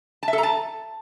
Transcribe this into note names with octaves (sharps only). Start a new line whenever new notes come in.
A5
E5
A4
A#5
A5